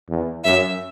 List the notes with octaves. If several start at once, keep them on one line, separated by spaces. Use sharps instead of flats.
E2
F#2 E5